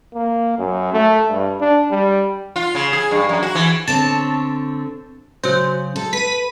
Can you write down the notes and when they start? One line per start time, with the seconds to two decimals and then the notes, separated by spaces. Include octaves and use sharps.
0.15 A#3
0.59 F#2
0.93 A3
1.31 G2
1.61 D4
1.91 G3
2.56 F4
2.75 C#3
2.93 G#4
3.11 G2
3.29 F#2
3.43 F#4
3.55 E3
3.88 D3 C4 C#5 A5
5.44 C#3 F#3 C5
5.96 A4
6.13 B4 B6 D#7